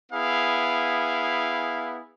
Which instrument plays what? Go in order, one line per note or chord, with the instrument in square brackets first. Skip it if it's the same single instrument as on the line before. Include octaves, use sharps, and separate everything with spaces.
[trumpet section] B3 E4 G#4 F5